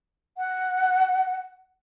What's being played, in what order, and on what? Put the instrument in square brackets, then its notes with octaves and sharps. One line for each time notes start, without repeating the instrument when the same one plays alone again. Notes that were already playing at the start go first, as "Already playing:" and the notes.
[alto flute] F#5